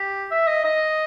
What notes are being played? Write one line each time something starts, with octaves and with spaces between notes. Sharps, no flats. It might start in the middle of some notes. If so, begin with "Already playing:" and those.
Already playing: G4
E5
D#5
D#5